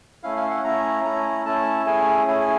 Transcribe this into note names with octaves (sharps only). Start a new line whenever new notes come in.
A3 C#4 E4 F5
F5
F#5
A3 C#4 E4 A#5
A3 C#4 E4 A#5
A3 C#4 E4 A5
A3 C#4 E4 G#4 G#5
A3 C#4 E4 G#4 G#5